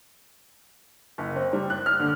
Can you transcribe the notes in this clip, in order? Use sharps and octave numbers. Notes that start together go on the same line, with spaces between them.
F#1
C4
G3
F#6
F6
D3